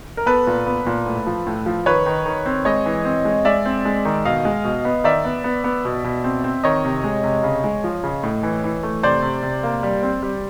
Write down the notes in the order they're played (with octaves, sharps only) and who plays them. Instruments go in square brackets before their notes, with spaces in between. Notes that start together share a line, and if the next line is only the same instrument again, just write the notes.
[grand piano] A#4
B3 A4 B4
A#2
B3
A#2
A2
F3
A2
F3
D#3 B4 C#5
D#3
D#3
C4
G#3 C#5 D#5
E3
C4
G#3
G#3 D5 E5
C4
G#3
D#3
B2 D#5 F5
G#3
B2
B3
D#3 D5 E5
B3
B3
B3
B2
B2
C4
C4
D#3 C#5 D#5
C3
G#3
C3
C#3
G#3
F3
C#3
A2
E3
E3
A3
C3 C5 D5
C3
C3
A#3
G3
C4
G3